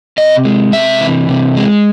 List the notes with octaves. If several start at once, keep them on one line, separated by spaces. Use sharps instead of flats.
C3 D#5
G#3
C3 E5
E3
C3
G#3